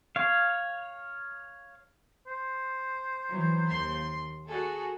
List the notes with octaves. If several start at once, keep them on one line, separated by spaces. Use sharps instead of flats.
C#5 F5
C5
E3 F#3
D#2 C6
F#4 G#4 A4